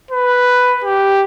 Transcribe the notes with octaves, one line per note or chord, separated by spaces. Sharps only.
B4
G4